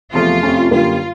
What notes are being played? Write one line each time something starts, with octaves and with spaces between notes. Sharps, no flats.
E2 C3 F3 A3 F4
F2 C3 F3 A3 C#4
F#2 D3 G3 A#3 F4